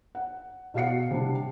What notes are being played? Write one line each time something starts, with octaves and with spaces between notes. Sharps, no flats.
F#5
B2 F#4 F5 F#5 C7 C#7
C3 G3 D4